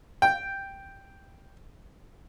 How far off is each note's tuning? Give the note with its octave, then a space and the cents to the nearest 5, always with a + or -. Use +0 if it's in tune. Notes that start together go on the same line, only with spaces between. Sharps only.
G5 +0